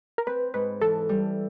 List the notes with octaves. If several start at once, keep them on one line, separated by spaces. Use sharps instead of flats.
A#4
C4 B4
G#2 B4
E3 A4
G3